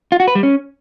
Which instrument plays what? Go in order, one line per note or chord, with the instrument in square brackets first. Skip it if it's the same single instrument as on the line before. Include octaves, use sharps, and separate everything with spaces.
[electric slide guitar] F4
F#4
B4
G3
C#4